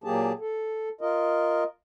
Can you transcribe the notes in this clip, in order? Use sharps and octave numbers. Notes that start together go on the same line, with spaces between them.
A#2 F#3 A#3 G4 G#4 A5
A4
F4 A#4 D#5